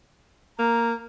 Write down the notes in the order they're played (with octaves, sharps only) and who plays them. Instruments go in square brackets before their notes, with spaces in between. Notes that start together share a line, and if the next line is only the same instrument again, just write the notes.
[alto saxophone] A#3 [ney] A#5